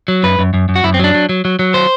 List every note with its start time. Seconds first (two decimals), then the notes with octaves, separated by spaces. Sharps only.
0.08 F#3
0.23 F#2 B4
0.39 F#2
0.54 F#2
0.69 F#2
0.76 F#4
0.84 F#2 E4
0.94 C4
0.99 F#3 D4
1.14 F#3
1.29 F#3
1.45 F#3
1.59 F#3
1.74 C5